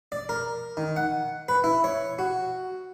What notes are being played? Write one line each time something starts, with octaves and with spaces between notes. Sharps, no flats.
D5
A#4
D#3
F#5
B4
E4
C#5
F#4